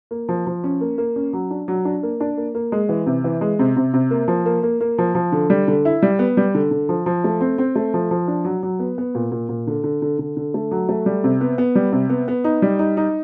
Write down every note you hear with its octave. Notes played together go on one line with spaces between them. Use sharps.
A#3
F3
F3
C#4
A#3
A#3
C#4
F#3
D4
F#3
D4
A#3
D4
A#3
A#3
G#3
E3
C3
E3
G#3
C3
C3
C3
A#3
F3
A#3
A#3
A#3
F3
F3
D3
G3
D3
E4
G3
B3
G3
D3
D3
F3
F3
A3
C4
C4
A3
F3
F3
D4
F#3
F#3
B3
B3
A#2
A#2
A#2
D3
D3
D3
D3
D3
A3
F#3
A3
G3
C3
B3
B3
G3
C3
B3
B3
D#4
G3
D#4
D#4